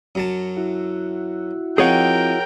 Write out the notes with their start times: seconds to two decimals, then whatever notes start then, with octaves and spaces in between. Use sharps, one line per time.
0.15 F#2 F#3 A5
0.57 E4 F#4
1.78 F3 C4 D#4 G#4 A#4 C#5 F#5 G5